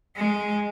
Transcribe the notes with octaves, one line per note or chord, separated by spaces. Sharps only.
G#3